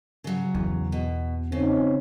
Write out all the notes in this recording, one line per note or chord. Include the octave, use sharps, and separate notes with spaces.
C#3 F#3
E2
B2
C#3 C4 C#4 D#4